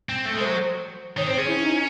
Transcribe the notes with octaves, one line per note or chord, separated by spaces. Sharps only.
C4
A3
G#3 A4
F#3 C5
D#3 C#5
C4 C5
C#4 G#4
E4
D#4